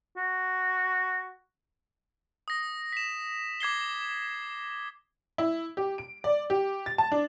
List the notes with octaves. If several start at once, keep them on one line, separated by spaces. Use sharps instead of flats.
F#4
D#6 A#6
B6 E7
D6 G#6 C7 G7
E4
G4
D7
D5
G4
A6
A5
D4